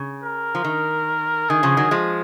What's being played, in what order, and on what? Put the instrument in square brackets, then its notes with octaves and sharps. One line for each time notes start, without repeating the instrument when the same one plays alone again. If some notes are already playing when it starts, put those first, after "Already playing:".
Already playing: [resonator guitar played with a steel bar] C#3
[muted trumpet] A#4
[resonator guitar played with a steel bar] F3
D#3
[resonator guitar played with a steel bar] D#3 [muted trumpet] G#4
[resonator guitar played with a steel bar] C#3 F3
D#3 F#3
F3 G#3